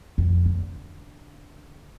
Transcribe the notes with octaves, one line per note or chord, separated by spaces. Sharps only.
F2
D3